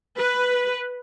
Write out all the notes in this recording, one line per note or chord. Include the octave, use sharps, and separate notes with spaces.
B4